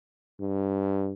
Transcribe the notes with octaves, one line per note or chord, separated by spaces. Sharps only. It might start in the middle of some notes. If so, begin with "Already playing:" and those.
G2